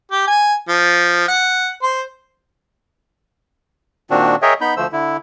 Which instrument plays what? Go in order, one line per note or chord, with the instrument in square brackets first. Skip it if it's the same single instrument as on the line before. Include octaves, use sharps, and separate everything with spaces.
[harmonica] G4
G#5
F3
F#5
C5
[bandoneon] A#2 D#3 C4 D4 F#4
G#4 A#4 C#5 D#5 E5 G5
B3 D#4 B5 G6
D2 F3 A3 C5 E6
D3 E4